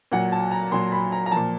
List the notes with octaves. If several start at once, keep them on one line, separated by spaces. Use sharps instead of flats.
A#2 F#3 F#5
A5
A#5
A#2 F#3 C6
B5
A#5
A#5
A#2 F3 A5